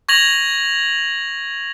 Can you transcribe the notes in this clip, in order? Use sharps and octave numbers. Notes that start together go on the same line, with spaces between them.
C#6 G#6 A#6 F7 F#7